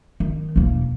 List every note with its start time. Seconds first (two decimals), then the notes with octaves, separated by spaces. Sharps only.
0.20 D#3
0.56 E1 A#3